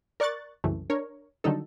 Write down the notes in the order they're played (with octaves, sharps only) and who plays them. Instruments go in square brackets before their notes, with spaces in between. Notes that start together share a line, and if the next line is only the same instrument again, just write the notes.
[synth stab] A#4 D5 C#6 F#6 A6
C2 F#2 C#3 E3 A3
D4 A#4 C#5
D3 D#3 F#3 G3 D#4 A4